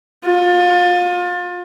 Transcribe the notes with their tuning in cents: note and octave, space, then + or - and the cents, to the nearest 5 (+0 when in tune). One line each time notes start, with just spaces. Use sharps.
F4 +30